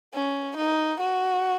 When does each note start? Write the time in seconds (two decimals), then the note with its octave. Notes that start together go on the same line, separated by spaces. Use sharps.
0.14 C#4
0.57 D#4
1.01 F#4